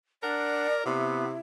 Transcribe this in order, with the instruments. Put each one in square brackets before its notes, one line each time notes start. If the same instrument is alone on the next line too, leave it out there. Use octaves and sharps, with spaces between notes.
[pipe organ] D4 F#5 [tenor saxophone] A#4 [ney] D5
[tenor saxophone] C3 [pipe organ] B3 [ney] E4